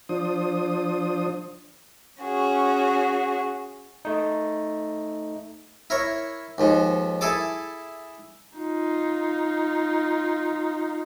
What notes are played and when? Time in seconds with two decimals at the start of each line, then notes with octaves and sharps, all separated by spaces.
0.09 F3 D4 C5 D#6
2.21 C#4 F#4 G#4
4.05 A3 D#4
5.90 E4 A#4 C#5
6.58 D#2 G#2 F3
7.21 E4 G#4 A4 A5 D6
8.59 D#4 F4